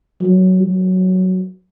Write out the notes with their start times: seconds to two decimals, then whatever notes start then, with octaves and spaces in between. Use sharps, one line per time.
0.21 F#3
0.64 F#3